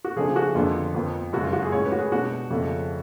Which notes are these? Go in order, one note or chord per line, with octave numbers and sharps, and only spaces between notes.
F#4
C#3 F3 A3 D4 G#4
F#4
F2 D3 F3 B3 D4 F4
F2 F3 B3
F#2 C#3 G#3 F#4
F4
F#4
G#4
A2 G#3 C#4 C#5
B4
F#4
G#4
B2 G#3 B3 D4 F#4
F2 C#3 F3 A3 C#4